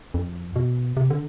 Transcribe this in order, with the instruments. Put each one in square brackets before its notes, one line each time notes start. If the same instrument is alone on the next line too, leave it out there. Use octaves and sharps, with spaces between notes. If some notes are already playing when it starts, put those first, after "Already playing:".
[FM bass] F2
B2
C3
D3